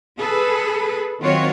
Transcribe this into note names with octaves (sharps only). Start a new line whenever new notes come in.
G#4 A4 B4
D#3 F#3 C4 F4 F#4 C#5